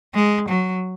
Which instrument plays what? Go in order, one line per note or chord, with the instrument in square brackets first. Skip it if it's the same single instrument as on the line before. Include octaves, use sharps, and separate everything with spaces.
[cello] G#3
F#3